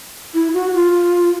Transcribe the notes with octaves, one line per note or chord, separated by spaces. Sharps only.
E4
F#4
F4